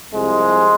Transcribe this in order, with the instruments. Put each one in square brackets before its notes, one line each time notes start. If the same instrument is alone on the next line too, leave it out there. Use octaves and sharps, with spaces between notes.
[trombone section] C2 C3 F3 G#3